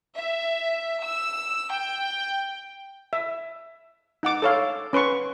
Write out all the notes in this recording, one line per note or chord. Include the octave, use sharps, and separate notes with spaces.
E5
E6
G5
E5
D#4 F#5 D6
A4 C#5 F5
C#4 B4 C6 C#6